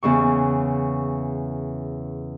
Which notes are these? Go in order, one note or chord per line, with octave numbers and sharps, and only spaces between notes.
E2 C#3 E3 C#6